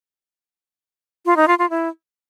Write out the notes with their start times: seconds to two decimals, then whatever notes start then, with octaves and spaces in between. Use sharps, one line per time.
1.25 F4
1.37 D#4
1.48 F4
1.59 F4
1.70 E4